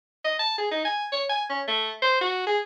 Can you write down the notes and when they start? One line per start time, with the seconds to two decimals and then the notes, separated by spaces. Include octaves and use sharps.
0.24 D#5
0.39 A5
0.58 G#4
0.71 D#4
0.85 G#5
1.12 C#5
1.30 G#5
1.50 C#4
1.68 A3
2.02 C5
2.21 F#4
2.47 G#4